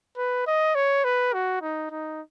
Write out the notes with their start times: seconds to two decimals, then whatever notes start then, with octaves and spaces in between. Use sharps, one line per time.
0.18 B4
0.47 D#5
0.75 C#5
1.05 B4
1.34 F#4
1.62 D#4
1.91 D#4